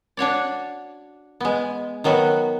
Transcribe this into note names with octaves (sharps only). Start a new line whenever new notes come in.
D4 F#4 C#5 D5
G#3 B3
D#3 F#3 B3 F#4